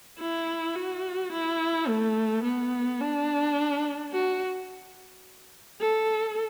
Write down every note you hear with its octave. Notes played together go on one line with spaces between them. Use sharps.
E4
F#4
E4
A3
B3
D4
F#4
A4